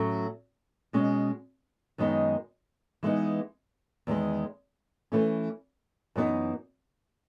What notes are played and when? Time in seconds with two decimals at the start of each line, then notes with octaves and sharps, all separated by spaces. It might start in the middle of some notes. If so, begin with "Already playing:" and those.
Already playing: A2 F#3 A3 C#4
0.93 B2 G#3 C#4
1.98 F#2 D#3 G#3 B3 D#4
3.03 E3 G#3 B3 D#4
4.07 E2 D#3 G#3
5.12 E3 A3 C#4
6.16 F#2 E3 B3 D#4